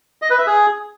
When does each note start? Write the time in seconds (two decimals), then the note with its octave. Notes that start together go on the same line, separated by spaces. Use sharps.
0.22 D#5
0.30 B4
0.38 E5
0.47 G#4